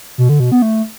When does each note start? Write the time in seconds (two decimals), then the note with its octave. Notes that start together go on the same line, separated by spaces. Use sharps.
0.18 B2
0.29 D3
0.40 B2
0.52 B3
0.62 A3